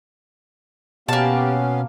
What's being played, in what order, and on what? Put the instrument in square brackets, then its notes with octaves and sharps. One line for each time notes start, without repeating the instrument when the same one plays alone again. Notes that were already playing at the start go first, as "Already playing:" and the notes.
[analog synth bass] B2 [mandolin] A#3 A5 [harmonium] B3 C#4 F5 [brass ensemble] G4